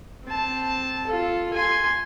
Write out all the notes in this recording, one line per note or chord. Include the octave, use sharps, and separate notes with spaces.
C4 A5
F4 A4
G#5 C6